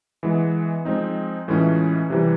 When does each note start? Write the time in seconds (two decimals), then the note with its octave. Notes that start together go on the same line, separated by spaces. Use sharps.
0.23 E3 G#3 B3
0.85 F3 G#3 C4 D#4
1.48 A2 E3 G#3 C#4 F4
2.10 C3 E3 G3